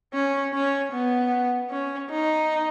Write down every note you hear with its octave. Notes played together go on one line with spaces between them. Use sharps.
C#4
C#4
B3
C#4
D#4